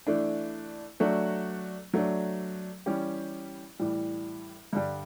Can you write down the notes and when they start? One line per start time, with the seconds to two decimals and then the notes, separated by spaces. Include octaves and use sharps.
0.07 E3 A3 D4
1.00 F#3 A3 D4 F#4
1.93 F#3 A3 D4
2.86 E3 G3 C#4 G4
3.79 A2 E3 G3
4.73 G2 D3 G3